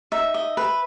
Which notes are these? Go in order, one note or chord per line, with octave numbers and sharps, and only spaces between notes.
D#4 E5
D#5
B4